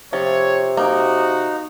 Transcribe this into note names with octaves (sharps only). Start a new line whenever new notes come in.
C3 F3 C#5
A#3 D#4 F#4